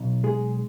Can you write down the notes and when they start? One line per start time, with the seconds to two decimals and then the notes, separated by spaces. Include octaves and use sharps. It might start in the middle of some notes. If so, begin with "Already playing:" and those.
Already playing: B1
0.24 G#3 G#4